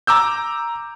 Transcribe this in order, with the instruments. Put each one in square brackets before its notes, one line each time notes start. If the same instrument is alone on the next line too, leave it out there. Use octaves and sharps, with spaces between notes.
[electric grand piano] A#5 D6 E6 G6